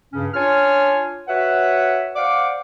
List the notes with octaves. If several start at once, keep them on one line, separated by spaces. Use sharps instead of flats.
G2 C#3 C#4
D4 F4 C#5 G#5 F6
F#4 B4 C#5 E5 F#5
C5 D5 F5 F#5 D6